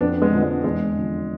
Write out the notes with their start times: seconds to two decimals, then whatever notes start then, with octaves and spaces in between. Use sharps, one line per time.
0.01 F2 B3 D4
0.22 G#3 B3
0.33 D3 F3
0.43 G#3
0.64 E2 G#3
0.96 D3 F3